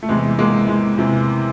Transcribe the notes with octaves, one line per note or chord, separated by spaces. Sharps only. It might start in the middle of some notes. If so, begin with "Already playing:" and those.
A3
E2 C3 E3 G#3
G#3 A#3
G#3
E2 C3 E3